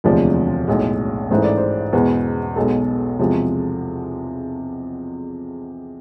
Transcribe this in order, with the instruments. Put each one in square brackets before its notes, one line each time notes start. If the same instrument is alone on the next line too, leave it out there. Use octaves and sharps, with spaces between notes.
[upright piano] E1 D2 C3 F3 G#3 D5
B1 A2 G#3
A1 G#2 E3 A3 C5
D5
C5
E2 B2 G#3 B4
B1 B2 G#3 A4
E2 C3 F3 G#3